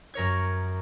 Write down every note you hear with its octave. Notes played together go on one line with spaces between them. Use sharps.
F#2 A#4 C#5 G#6